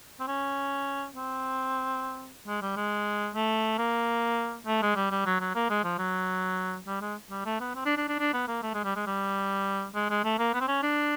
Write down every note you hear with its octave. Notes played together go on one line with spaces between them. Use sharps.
C4
C#4
C4
G#3
G3
G#3
A3
A#3
A3
G#3
G3
G3
F#3
F#3
A#3
G#3
F3
F#3
G3
G#3
G3
A3
B3
C4
D4
D4
D4
D4
B3
A#3
A3
G#3
G3
G#3
G3
G#3
G#3
A3
A#3
B3
C4
C#4
D4